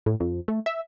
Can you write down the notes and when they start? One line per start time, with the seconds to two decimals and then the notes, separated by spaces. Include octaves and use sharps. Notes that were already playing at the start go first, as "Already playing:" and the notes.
0.06 A2
0.20 F2
0.48 A3
0.66 E5